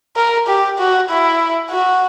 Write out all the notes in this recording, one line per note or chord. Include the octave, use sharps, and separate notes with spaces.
A#4
G4
F#4
E4
F#4